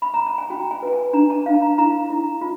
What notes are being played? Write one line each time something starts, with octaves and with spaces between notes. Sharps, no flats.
B5
A#5
A5
G#5
F#4 G5
G#5
B4 G#5
A5
D4 A#5
A5
D4 F5
A5
A#5
E4 A#5
E4
F4